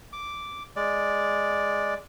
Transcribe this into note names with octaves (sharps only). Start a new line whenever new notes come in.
D6
G#3 D5